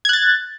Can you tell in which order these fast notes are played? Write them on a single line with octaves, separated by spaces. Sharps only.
G#6 F#6 A6